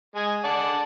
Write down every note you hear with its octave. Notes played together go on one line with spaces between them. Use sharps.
G#3 G#5
D5 F#5 A5